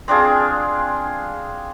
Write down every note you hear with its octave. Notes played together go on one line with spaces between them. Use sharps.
C4 D4 F4 G#4